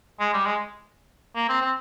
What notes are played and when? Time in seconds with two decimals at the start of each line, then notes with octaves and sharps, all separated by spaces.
0.20 G#3
0.33 G3
0.46 G#3
1.35 A#3
1.49 C4
1.61 C4